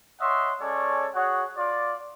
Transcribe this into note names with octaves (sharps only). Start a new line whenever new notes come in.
C#5 D#5 E5 F#5 C6
G#3 C#4 A4 C#5 D5
F#4 G#4 C#5 F#5
F4 D5